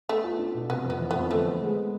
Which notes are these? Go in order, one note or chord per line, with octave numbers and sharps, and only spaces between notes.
A3 B3
F4
D4
B2
C3 B3
F2 B3
E3
B3
F2
D3 A3
B3
G#3